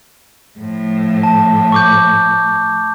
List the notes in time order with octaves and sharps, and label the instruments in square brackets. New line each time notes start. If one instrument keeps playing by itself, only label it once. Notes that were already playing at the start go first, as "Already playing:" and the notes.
[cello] A2 F3
[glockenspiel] A5
C#6 D6 G6